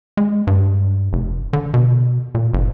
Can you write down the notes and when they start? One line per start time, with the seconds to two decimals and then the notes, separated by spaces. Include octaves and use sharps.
0.17 G#3
0.47 G2
1.13 F1
1.53 D3
1.74 B2
2.35 A#2
2.53 F#1